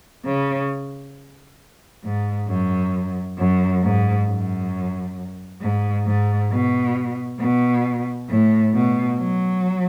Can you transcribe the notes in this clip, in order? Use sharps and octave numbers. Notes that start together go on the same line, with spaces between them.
C#3
G#2
F#2
F#2
G#2
F#2
G#2
G#2
B2
B2
A2
B2
F#3